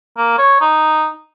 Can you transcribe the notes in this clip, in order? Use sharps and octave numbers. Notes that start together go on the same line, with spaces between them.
A#3
C#5
D#4